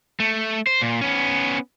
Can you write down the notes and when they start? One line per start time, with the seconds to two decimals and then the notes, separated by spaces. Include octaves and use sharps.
0.20 A3
0.67 C5
0.82 A#2
1.01 B3 C#4